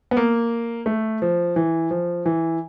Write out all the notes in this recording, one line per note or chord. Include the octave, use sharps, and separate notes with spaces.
B3
A#3
A3
F3
E3
F3
E3